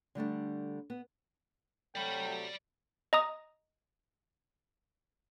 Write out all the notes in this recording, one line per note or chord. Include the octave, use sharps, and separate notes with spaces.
D3 G3 A3 D4
B3
C3 F#3 A3 D5 G5 B5
D#5 A#5 D#6